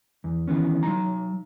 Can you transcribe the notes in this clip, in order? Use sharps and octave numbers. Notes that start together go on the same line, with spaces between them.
E2
D#3 E3 B3 C#4
F#3 D#4 A#5